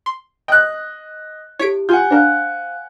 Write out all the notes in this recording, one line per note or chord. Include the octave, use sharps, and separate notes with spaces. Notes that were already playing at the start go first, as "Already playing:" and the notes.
C6
D#5 G5 F#6
E4 G4 A4 C#5 B6 D7
F4 F#5 G#5 G6
D4 A#4 C5 F5 F#6